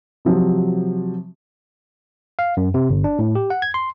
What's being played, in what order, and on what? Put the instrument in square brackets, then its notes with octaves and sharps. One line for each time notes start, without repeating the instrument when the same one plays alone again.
[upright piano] C3 F3 F#3
[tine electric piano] F5
F#2
C3
G1
D4
A2
G4
F#5
G#6
C6